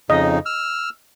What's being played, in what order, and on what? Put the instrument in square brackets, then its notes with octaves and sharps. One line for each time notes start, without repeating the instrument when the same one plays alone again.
[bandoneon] F2 C#3 D#4 [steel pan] D#5
[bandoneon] E6 F6